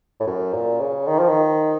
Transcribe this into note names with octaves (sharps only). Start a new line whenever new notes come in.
A2
F#2
A#2
C#3
D#3
F3
D#3